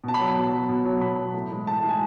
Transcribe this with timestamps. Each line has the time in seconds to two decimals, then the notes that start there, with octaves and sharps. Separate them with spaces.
0.04 B2 A5
0.14 B5
0.19 F#3
0.25 B5
0.36 B2
0.52 F#3
0.69 B2
0.85 F#3
1.01 B2 B5
1.18 F#3
1.34 A2
1.51 E3 G#3
1.67 A2 A5
1.78 A5
1.83 E3 G#3
1.89 G#5